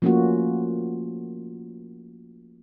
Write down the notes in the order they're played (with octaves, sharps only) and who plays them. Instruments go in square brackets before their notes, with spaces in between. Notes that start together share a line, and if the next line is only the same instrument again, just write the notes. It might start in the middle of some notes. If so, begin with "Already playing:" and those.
[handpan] F3 A3 A#3 C#4 F4 F#4